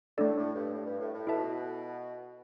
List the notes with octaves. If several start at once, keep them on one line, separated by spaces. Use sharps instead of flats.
A2 A3 D4 A4 D5
A2
G2
A2
G2
A2
A2
B2 E4 A4 E5 A5